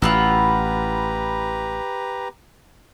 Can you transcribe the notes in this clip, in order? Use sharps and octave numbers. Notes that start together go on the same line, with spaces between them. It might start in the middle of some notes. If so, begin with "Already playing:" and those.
A1 E4 F4 G4 B4 F#5 A#5